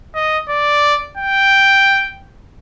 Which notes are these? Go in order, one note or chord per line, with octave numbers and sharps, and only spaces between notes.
D#5
D5
G5